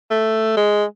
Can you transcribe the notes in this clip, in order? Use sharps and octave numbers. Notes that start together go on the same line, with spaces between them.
A3
G#3